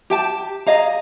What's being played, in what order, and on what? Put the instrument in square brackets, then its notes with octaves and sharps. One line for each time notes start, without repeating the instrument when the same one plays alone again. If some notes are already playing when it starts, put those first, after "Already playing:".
[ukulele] G4 G5 A5
G#4 D#5 F5 A#5